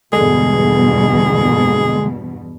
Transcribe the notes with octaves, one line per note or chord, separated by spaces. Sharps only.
E2 G2 B2 D3 G#3 G#4